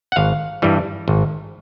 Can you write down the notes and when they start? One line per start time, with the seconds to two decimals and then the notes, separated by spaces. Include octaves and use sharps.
0.12 F#5
0.16 G#1 F5
0.62 G2 E3 G3
1.08 G#1